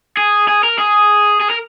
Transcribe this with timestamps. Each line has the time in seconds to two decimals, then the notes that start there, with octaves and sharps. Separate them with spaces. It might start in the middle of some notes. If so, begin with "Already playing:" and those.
0.17 G#4
0.48 G#4
0.64 A#4
0.79 G#4
1.42 G#4
1.51 A#4